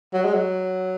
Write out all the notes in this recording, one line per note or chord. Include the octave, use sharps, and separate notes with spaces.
F#3
G#3
F#3